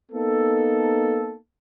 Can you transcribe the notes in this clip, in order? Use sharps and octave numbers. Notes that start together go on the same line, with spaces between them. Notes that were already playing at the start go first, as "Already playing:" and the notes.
A#3 B3 D#4 A4